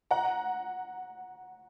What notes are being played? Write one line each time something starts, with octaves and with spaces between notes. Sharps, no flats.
F#5 A#5